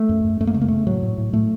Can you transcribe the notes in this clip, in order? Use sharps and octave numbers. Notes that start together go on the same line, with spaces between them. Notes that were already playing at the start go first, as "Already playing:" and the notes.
Already playing: A3
F#2
F#2
F#2 A3
A#3
C#3 A3
A#3
C#3 A3
A2 F#3
A2
A2
A2 A3